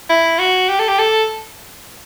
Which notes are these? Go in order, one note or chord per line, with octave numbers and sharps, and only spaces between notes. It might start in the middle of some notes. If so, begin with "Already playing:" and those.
E4
F#4
G4
A4
G4
A4